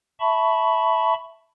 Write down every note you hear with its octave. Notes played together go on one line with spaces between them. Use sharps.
E5 A5 B5 C#6